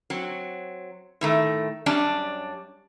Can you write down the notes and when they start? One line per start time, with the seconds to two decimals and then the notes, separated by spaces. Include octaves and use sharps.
0.10 F#3 C4
1.21 A2 D#3 A3
1.86 F#2 G3 C#4 D4 D5 A5